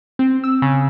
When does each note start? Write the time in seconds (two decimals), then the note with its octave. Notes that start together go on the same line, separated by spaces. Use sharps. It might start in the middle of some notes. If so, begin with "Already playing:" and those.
0.19 C4
0.44 E6
0.62 C#3